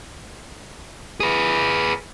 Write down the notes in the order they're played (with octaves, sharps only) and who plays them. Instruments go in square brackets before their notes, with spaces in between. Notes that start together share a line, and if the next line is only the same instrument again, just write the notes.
[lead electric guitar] G#4 B4